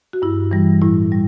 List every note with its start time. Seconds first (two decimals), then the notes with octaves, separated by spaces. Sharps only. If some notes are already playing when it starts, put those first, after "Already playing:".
0.13 F#4
0.22 G2 E4
0.51 E3 G3
0.82 A2 E4
1.12 G3